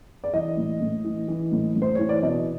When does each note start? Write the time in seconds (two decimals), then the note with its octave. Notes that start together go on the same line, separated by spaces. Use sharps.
0.24 D5
0.34 E3 D#5
0.57 A2
0.81 A2
1.04 E3
1.28 E3
1.52 A2
1.76 A2
1.82 C5
1.95 E3 C#5
2.09 D5
2.22 B2 D#5